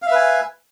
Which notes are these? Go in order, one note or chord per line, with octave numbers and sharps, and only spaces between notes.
B4 E5 F5 G#5